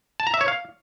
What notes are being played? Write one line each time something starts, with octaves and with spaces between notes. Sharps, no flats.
A5
A#5
E5
C#5
F5